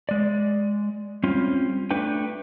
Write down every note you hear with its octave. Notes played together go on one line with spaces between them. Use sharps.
G#3 D5
G3 C4 C#4 F4
A3 D4 B4 G5